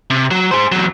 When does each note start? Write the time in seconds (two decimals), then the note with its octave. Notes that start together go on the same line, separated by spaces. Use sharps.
0.10 C3
0.31 F#3
0.51 G#4 C5
0.72 E2 F#3